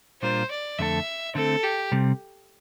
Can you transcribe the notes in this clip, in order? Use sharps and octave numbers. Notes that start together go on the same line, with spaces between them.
A#2 G3 D4 F4 A#4 C5
D5
F2 D3 A3 E4 A4 E5
D3 A3 C4 A4
G4
C3 G3 C4